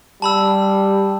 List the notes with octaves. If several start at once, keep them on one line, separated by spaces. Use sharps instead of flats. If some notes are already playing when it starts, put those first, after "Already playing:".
G3 A5 B5 E6